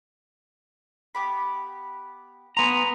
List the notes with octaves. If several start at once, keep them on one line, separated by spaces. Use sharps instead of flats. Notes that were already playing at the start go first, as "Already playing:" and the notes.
B3 G4 B5
B3 C5 G#5 A#5 C6